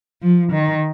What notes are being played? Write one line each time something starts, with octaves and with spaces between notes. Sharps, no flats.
F3
D#3